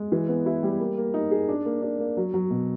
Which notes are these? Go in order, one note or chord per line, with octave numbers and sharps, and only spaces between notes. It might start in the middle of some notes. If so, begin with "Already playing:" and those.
Already playing: G#3
E3
B3
E4
G3
A#3
A#3
D#4
G#4
D4
A#3
D4
A#3
F#3
F#3
B2